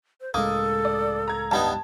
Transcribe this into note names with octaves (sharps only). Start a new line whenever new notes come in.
C5
C#2 A2 G#3 A#3 A4 D#6
D5
A#5 G#6
G2 B3 D#4 A5